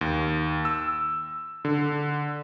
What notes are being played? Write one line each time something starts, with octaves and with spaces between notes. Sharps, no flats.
D#2
E6
D3